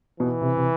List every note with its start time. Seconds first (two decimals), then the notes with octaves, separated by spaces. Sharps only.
0.20 B2 E3
0.41 C3
0.57 C3